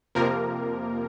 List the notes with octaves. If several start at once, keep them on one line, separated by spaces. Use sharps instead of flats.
F2 C3 F3 A#3 A#4